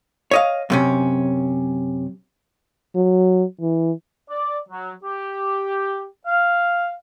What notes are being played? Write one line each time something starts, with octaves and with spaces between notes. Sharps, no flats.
C#5 D#5 F5
F#2 C3 C#4
F#3
E3
D5
F#3
G4
F5